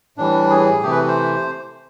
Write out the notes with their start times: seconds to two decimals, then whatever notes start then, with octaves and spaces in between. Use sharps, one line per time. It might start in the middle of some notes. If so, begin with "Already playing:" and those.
0.17 A2 E3 G3 D4
0.50 G#4
0.83 C3 E3 A3 G4
0.92 B4
1.08 C5